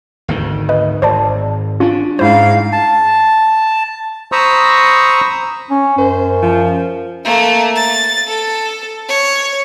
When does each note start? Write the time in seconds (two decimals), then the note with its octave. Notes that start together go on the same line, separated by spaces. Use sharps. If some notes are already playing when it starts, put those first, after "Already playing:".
0.28 G#1 D2 D#3
0.69 B4 D#5
1.02 G#1 C5 D5 A5
1.80 C#4 D4 F4
2.19 G#2 E4 C5 F5
2.72 A5
4.32 C5 A#5 B5 C#6 D#6 E6
5.70 C#4
5.98 F#2 C5
6.43 F3
7.25 A3 A#3
7.76 A6
8.27 A4
9.09 C#5